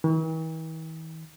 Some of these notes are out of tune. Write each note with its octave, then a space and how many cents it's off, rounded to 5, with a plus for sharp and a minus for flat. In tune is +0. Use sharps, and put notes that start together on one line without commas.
E3 -45